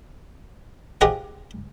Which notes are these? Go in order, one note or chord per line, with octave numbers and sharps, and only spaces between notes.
F4 G4 G#4 C5 D#5 F#5